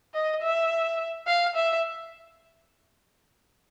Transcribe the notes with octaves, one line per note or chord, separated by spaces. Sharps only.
D#5
E5
F5
E5